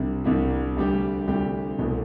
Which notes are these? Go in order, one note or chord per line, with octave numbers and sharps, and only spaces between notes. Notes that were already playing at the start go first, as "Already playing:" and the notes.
Already playing: C2 C3 G3 D4
C2 C3 G3 D4
D2 C3 G3 D4 G4
D2 C3 G3 D4 G4
C2 B2 A3 C4